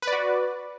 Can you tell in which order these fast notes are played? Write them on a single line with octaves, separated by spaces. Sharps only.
B4 D5 F#4